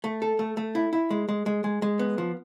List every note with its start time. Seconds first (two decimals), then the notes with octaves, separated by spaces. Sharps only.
0.04 A3
0.22 A4
0.39 A3
0.57 A3
0.75 E4
0.93 E4
1.11 G#3
1.29 G#3
1.46 G#3
1.64 G#3
1.82 G#3
1.99 B3
2.18 F3